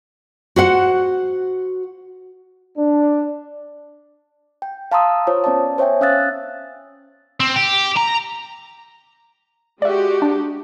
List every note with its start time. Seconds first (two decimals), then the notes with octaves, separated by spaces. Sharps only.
0.56 F#4 C5 F#5
2.78 D4
4.62 G5
4.92 F5 A5 A#5 C6 D#6 E6
5.27 F4 C5 C#5 D#6
5.44 B3 C#4 D5 A5
5.78 C5 C#5 E5 G5 G#5
6.01 C#4 F5 D#6 E6 F#6 A6
7.40 C4
7.56 G4
7.97 A#5
9.82 G#3 F#4 G4 D5 E5
10.22 D4